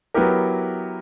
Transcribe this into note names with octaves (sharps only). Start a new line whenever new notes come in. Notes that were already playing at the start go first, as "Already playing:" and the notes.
F#3 B3 E4 G4 A#4